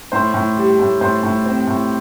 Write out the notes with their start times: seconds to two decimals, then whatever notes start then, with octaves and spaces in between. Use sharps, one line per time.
0.12 A2 C5
0.34 A2
0.57 G3
0.79 A2
1.01 A2 C5
1.23 A2
1.46 C4
1.67 A2